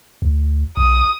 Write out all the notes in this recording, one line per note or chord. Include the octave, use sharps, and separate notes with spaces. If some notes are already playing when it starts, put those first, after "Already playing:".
D2
B1 D#6